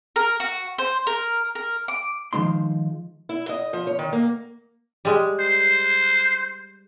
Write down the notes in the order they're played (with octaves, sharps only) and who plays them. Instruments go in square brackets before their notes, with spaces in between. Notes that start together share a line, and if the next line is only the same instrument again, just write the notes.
[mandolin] A#4
F#4
C5
A#4
A#4
D6
[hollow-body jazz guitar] D#3 F3 G#3 D#4 C6
[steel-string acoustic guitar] E4
D#5
F3
C#5
D#3
A#3
[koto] G3 G#3
[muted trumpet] C5